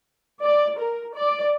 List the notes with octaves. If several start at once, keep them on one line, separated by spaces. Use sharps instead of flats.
D5
A#4
D5